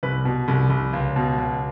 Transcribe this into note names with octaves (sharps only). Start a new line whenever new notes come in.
C2 B4
B2
C2
C2
C#2
B2
C#2